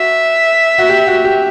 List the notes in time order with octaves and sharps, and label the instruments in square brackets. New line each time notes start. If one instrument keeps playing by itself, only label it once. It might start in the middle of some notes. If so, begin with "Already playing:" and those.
Already playing: [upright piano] F#4 [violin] E5
[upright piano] F#4
G4
F#4
G4